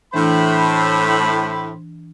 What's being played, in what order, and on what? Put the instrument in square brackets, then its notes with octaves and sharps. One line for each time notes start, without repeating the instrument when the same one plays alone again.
[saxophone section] A2 [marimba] E3 D4 [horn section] C5 B5